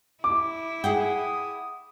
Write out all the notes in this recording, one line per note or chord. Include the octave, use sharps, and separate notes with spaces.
E4 D6
G#4 F#5 G5 D#6